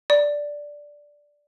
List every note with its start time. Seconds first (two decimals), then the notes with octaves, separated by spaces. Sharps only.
0.10 D5